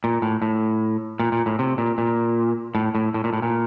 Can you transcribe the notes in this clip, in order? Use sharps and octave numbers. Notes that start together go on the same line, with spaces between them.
A#2
A2
A2
A#2
A#2
A2
C3
A#2
A#2
A2
A2
A2
A#2
A2
A#2